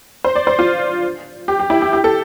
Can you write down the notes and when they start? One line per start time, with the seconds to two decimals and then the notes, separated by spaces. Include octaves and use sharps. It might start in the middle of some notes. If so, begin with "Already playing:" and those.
0.24 C5
0.35 D5
0.47 C5
0.59 F4
1.48 G4
1.60 G4
1.70 E4
1.82 G4
1.93 G4
2.04 A4